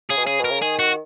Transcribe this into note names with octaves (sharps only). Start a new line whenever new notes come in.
C#3 G#4
B2
C#3 G#4
B2
A#4
C#3
D#3 G#4
F#4